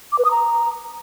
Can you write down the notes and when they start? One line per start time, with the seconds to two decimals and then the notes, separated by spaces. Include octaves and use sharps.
0.12 D6
0.19 B4
0.25 D#6
0.31 A#5